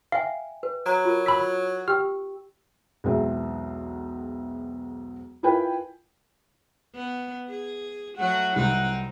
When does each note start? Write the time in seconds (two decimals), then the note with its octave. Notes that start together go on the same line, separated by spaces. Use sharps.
0.12 E5 F5 G5 G#5
0.63 B4
0.86 F#3 A#5
1.05 F4 A#4
1.26 B5 E6 B6
1.88 G4 G5 E6 F6
3.04 B1 E2 G#3 C4 E5
5.43 E4 F4 A#4 B4 G5 G#5
6.95 B3
7.50 G#4
8.18 F#3 A3 F#4 F#5
8.56 C2 C4 D#4 F#5